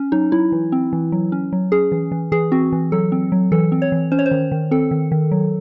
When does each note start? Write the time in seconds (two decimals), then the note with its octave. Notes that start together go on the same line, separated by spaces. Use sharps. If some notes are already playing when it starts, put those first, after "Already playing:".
Already playing: C#4
0.12 F#3 D#4
0.32 F#3 E4
0.52 E3
0.72 C4
0.93 E3
1.12 F#3
1.32 C#4
1.52 F#3
1.72 C#4 G#4
1.92 E3
2.12 E3
2.32 E3 G#4
2.52 C4 F#4
2.72 E3
2.92 F#3 A4
3.12 C4
3.32 F#3
3.52 E3 A4
3.72 C4
3.82 C#5
3.92 E3
4.12 C#4 C5
4.19 C#5
4.26 C5
4.31 D#3
4.52 D#3
4.71 C4 A4
4.91 D#3
5.12 D#3
5.31 F#3